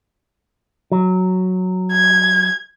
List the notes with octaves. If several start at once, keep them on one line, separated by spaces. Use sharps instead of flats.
F#3
G#6